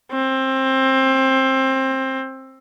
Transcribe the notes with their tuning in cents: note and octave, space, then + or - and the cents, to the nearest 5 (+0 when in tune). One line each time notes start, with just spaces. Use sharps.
C4 +20